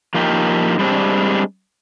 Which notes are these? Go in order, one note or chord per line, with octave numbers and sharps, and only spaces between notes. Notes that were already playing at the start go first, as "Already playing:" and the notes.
F3 A#3 D#4 G4
G3 G#3 C4 D4